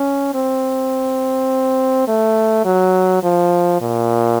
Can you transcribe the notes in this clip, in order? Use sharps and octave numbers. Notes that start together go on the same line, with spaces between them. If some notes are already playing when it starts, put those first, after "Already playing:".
Already playing: C#4
C4
A3
F#3
F3
A#2